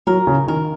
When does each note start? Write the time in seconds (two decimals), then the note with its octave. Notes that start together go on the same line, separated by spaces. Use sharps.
0.07 F#3 A#4
0.27 C#3
0.48 D#3 A#4